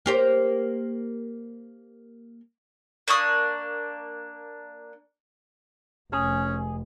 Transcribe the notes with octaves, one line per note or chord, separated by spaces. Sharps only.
A#3 G4 C5
A#3 D4 C#6 D#6
F1 C#4 G#4